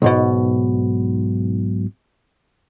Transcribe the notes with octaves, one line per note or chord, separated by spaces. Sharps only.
B1 G#2 B2